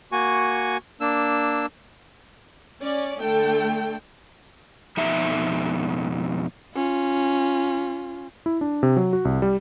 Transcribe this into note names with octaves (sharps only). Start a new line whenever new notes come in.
A#3 F#4 G#5 C#6
A#3 D4 E6
C#4 D5
D3 A3 A4 G5
F2 B2 D#4 E5 A#5
C#4 F4
E4
D4
C3
F#3
F#4
C2
G3